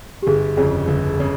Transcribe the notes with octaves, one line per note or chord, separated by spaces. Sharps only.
G4
G1 G#4
F2 C#3 G#4
G1
C#3